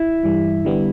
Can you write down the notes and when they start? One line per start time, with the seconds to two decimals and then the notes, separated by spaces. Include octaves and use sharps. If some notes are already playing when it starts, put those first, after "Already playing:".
Already playing: E4
0.23 G2 E3 G3
0.65 D3 G3 B3